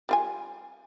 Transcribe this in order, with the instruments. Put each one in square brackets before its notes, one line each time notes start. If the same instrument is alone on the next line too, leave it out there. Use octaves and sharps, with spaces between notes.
[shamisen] G3 F4 G#5